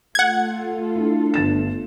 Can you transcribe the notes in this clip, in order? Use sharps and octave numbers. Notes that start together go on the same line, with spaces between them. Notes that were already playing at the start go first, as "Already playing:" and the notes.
A3 F4 A4 F#5 G#6
D4 E4
G1 A6 E7